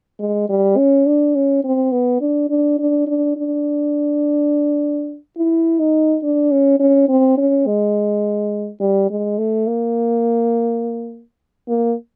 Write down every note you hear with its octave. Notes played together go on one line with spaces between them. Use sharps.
G#3
G3
C#4
D4
C#4
C4
B3
D4
D4
D4
D4
D4
E4
D#4
D4
C#4
C#4
C4
C#4
G#3
G3
G#3
A3
A#3
A#3